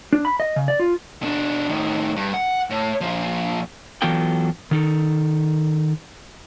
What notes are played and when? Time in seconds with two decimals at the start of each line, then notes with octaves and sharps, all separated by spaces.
0.13 D4
0.25 B5
0.40 D#5
0.56 C#3
0.68 D5
0.80 F4
1.22 B2 D4
1.69 A2 D#3
2.16 G2
2.34 F#5
2.70 A2
3.01 A#2 F3
4.02 E3 F#3 B3 F4 A4 G5
4.71 D#3 D#4 A4